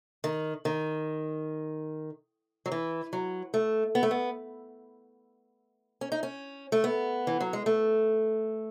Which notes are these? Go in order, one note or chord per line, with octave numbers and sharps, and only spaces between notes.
D#3
D#3
F#3
E3
F#3
A3
B3
A3
B3
C#4
D#4
C#4
A3
B3
E3
F#3
G#3
A3